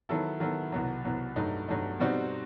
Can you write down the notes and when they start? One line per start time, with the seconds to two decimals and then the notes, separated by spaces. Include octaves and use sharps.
0.09 D#3 F#3 B3 E4 A4
0.40 D#3 F#3 B3 E4 A4
0.72 C2 B2 F#3
1.05 C2 B2 F#3
1.36 G2 F#3 A3 D#4
1.68 G2 F#3 A3 D#4
1.99 B2 G3 C4 D#4 F#4